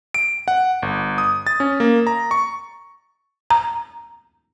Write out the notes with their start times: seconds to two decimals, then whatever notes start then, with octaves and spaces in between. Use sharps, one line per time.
0.14 D7
0.48 F#5
0.82 G1
1.18 D#6
1.47 A6
1.60 C#4
1.80 A#3
2.07 A#5
2.31 C#6
3.51 A#5